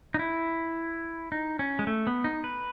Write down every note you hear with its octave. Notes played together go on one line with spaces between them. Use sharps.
D#4
E4
D#4
C#4
G#3
A3
B3
D#4
B4